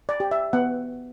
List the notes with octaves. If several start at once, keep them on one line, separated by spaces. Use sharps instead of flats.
D5
G4
E5
B3 F#5